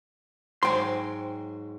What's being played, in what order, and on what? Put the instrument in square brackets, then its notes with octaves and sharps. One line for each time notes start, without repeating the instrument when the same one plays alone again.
[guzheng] G#2 F#3 G#5 [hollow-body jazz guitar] G5 C6